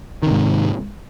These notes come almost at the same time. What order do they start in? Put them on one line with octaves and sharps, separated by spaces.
D#3 C3 G#2